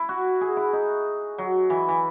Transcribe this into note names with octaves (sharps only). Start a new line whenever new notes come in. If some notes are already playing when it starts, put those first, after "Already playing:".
Already playing: E4
F#4
G#4
E4
D#4
F#3
E3
E3